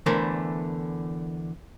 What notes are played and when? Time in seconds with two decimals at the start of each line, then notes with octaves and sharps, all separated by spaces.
0.06 E2 D3 E3 A3 A#4 C5